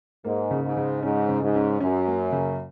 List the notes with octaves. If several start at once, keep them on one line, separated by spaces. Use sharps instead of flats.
G#2 A#3
C#3
G#2
C#3
G#2 C#4
C#3
G#2
C#4
F#2 C#4
A#3
C#3